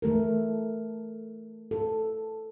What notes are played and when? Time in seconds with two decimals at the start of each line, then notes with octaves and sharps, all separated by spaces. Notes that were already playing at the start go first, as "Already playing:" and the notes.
0.02 E3 A3 A4 A#4
1.71 A4